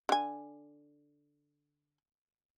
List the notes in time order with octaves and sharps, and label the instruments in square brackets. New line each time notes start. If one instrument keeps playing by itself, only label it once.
[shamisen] D3 G#5